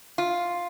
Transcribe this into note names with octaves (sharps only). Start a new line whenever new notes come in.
F4